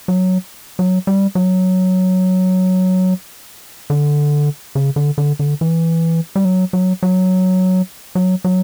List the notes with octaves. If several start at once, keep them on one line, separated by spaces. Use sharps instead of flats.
F#3
F#3
G3
F#3
D3
C#3
D3
D3
D3
E3
G3
F#3
F#3
F#3
F#3
F#3